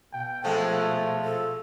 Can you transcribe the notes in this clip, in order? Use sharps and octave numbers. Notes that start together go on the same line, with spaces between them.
B2 G5
F2 F3 G#3 A3 A4
A4